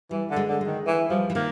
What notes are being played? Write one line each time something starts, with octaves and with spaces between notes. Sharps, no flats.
E3 G3
D3
G#3
D3
G#3
D#3
E3
F3 G3
E3
D#3 A#3